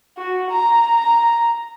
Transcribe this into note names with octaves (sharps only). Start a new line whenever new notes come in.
F#4
A#5